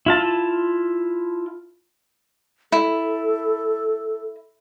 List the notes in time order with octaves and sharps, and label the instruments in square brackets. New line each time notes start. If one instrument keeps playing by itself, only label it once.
[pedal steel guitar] E4 F4 A5
[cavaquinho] E4 [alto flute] A4